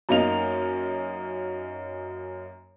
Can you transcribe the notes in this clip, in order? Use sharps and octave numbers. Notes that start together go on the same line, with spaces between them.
F#2 A#3 D#4 F7